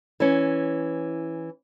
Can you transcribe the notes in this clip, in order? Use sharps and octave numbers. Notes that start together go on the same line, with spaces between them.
E3 C#4